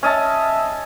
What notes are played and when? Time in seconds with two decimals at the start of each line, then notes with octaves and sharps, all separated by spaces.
0.03 C#4 D#5 E5 A5